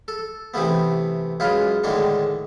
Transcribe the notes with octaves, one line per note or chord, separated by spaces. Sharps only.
A4
C3 E3 A3 B3
F#2 G#3 F4 B4
A2 D3 D#3 G#3 D4